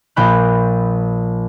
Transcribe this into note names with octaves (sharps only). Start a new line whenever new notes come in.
A#1 G5 B5 F#6